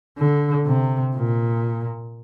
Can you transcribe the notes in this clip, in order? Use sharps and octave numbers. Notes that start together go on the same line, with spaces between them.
D3
C3
A#2